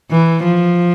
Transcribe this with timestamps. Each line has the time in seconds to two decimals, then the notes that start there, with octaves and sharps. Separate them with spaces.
0.11 E3
0.44 F3